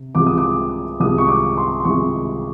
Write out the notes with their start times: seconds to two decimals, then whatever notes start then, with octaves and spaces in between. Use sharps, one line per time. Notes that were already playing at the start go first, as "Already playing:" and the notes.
Already playing: C3
0.15 C2 C3 F3 G#3 D6
0.26 D#6
0.37 D6
1.00 C2 C3 F3 G#3 D#6
1.18 C#6
1.28 D6
1.57 C6
1.80 C6
1.85 C2 C3 F3 G#3 C#6